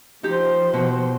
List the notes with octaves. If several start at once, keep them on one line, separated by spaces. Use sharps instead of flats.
F3 D#4 G4 C5
B2